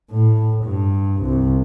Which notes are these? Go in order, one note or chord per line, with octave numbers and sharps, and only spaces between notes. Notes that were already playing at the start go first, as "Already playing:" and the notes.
A2
G2
C2